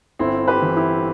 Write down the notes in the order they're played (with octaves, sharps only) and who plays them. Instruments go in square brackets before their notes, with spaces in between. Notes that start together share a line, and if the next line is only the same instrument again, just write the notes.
[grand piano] G1 C4 E4
G4 B4
E3
E4 G4